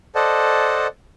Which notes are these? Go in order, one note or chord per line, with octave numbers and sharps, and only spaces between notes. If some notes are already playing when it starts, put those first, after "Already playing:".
A4 C5 D5 D#5 F#5 A5